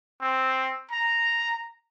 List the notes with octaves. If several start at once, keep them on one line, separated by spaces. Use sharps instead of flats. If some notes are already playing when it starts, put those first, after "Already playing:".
C4
A#5